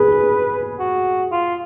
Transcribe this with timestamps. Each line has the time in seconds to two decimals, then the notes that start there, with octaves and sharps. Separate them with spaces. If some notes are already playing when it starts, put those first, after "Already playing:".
Already playing: G#4 B4
0.79 F#4
1.31 F4